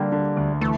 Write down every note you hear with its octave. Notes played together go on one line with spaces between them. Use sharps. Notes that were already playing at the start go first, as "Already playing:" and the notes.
Already playing: D3 G3 A#3
D3
D2
E3 A3